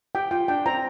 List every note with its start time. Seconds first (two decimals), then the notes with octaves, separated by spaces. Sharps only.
0.15 G4 G5
0.31 F4 G5
0.48 D4 G5
0.66 C4 A#5